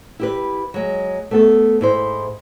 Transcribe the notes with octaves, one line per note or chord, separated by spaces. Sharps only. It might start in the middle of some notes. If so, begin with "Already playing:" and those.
E4 G4 B4
F#3 G#3
A3 B3 A4
G#2 E4 C5